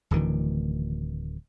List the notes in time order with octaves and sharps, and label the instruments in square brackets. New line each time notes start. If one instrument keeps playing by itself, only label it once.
[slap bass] D1 D2 D#3 E3